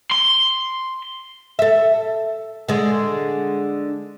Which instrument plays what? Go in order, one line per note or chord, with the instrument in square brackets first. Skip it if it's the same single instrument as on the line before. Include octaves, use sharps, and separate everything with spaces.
[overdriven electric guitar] C6
[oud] A4 E5
D3 G#3